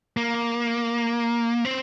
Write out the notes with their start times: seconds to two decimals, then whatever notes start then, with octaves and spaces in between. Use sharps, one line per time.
0.17 A#3
1.65 C4